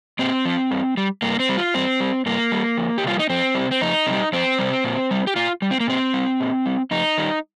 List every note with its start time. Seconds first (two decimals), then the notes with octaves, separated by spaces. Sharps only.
0.19 A#2 C4
0.45 F3
0.71 G2
0.97 G3
1.22 G2 A#3
1.39 C4
1.49 G3
1.57 F4
1.74 G2 C4
2.00 G3
2.26 G2 A#3
2.52 G3
2.78 F2
2.98 G4
3.04 C3 G3 F4
3.19 D#4
3.30 F2 C4
3.55 C3 G3
3.71 C4
3.81 F2 D#4
4.07 C3 G3
4.33 F2 C4
4.59 C3 G3
4.84 A#2
5.11 G3
5.27 G4
5.36 A#2 F4
5.62 G3
5.71 C4
5.80 A#3
5.88 A#2 C4
6.14 G3
6.40 A#2
6.66 G3
6.91 F2 D#4
7.18 D#3 G3